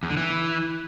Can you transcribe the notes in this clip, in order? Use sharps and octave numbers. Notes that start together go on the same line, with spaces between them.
E2
D3
E3